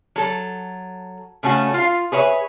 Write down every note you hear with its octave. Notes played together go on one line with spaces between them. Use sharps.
F#3 A4
C#3 A3 C#4 F#4
F4 F5
G#4 B4 C#5 E5